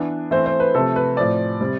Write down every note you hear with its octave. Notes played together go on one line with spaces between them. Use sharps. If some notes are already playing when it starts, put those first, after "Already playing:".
Already playing: E3 B3 D4
E3 A3 C4 C5
C5
B4
C3 F3 A3 A4
B4
A2 F3 C4 D5
C3 G3 C4